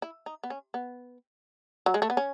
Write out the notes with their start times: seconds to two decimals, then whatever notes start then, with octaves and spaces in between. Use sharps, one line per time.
0.02 E4
0.26 D#4
0.43 B3
0.50 C#4
0.74 B3
1.86 F#3
1.94 G#3
2.02 A3
2.10 B3
2.17 C#4